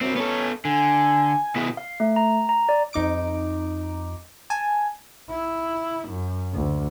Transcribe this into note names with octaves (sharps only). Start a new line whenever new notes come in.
F#2 G3 C4 D4
B3 C#4 A4
D3 G#5
C3 B3 E4 G#4 D#5
F5
A3
A#5
A#5
D5
F2 D#4 D6 D7
G#5 A5
E4
F#2
D2